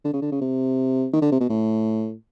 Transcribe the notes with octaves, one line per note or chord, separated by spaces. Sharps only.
D3
C#3
D3
C#3
C3
D#3
D3
C3
B2
A2